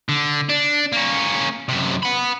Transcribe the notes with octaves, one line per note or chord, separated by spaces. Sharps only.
D3
D4
A#3 C#4
F#2 C3
F#5 B5